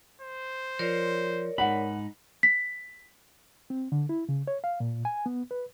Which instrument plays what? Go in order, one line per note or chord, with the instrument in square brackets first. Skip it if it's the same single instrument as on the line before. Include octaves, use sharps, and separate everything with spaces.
[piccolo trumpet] C5
[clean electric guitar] F3 [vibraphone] A#4 C#5 D5
[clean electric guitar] G#2 D#4 B5 [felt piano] F#5
[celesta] B6
[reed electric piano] C4
D3
E4
C#3
C#5
F5
A#2
G#5
B3
B4